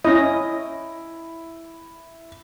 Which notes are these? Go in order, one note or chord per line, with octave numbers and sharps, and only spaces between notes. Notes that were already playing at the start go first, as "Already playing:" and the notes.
C#4 E4 D#5